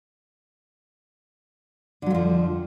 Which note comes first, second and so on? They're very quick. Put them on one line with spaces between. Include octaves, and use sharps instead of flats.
D3 F#3 F2 F3